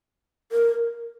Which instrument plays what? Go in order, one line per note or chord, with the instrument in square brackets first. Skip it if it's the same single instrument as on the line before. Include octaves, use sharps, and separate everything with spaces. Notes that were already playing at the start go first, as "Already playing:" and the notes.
[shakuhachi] A#4